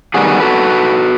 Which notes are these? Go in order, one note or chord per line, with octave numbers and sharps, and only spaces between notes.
D#3 G3 B3 F#4 G#4
F#4 A4 B4